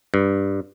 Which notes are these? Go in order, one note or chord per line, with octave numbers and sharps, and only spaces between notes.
G2